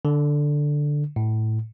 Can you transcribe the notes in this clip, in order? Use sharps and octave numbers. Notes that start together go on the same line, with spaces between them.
D3
A2